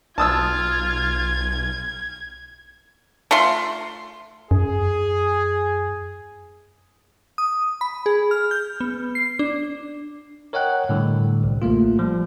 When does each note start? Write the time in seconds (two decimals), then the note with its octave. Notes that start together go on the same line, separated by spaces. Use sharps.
0.18 B1 F4 A5 D#6 E6 G#6
3.31 A3 F4 C6
4.51 F#2 G#4
7.38 D#6
7.81 B5
8.06 G#4
8.31 F6
8.51 G6
8.80 B3
9.15 C7
9.39 D4
10.53 A#4 C#5 D#5 F#5 G5 F#6
10.89 A2 D3 G3
11.44 C2
11.62 A1 A3 A#3 F4
11.99 F3 G3